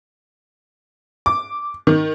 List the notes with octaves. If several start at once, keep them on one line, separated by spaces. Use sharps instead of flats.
D6
D#3